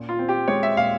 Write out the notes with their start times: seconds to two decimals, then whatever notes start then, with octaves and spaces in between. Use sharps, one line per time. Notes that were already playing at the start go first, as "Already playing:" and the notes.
Already playing: A#2 C#4
0.09 F4
0.19 C4
0.29 G4
0.48 G#3 C#5
0.63 E5
0.77 A#2 F5